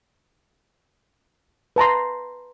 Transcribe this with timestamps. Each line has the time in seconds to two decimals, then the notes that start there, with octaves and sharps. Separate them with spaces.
1.76 B4 A5 A#5 C6